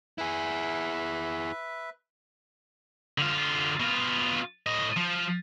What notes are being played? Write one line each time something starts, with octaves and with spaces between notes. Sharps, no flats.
E4 G#4 B4 E5
D3 F4
B2 F4
A2 D#5
F3